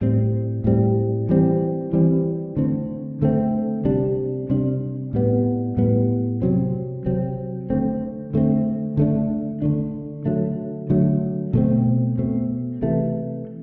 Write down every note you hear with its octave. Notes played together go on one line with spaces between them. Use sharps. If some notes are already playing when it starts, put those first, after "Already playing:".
A2 G3 C4
A2 G3 C4
E3 G3 C4
E3 G3 C4
D3 A3 C4
D3 A3 C4
C3 G3 D4
C3 G3 D4
A2 G3 B3
A2 G3 B3
C3 F#3 C4
C3 F#3 C4
D3 A3 C4
D3 A3 C4
D3 A3 D4
D3 A3 D4
D3 F#3 A3
D3 F#3 A3
B2 A3 C4
B2 A3 C4
C3 E3 A3